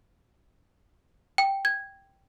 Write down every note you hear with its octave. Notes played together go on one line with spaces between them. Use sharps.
G5
G#6